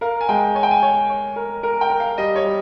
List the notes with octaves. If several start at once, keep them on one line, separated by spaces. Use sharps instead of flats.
A#4 F5
G#5
G#3 G5
C#5 G#5
G5
G#5
C#5
C#5
A#4
A#4
G5
A#4
F5
G3 D#5
C#5
G3